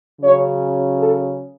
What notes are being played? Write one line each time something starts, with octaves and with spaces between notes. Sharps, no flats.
C#3 F#3 C#4 C#5
A4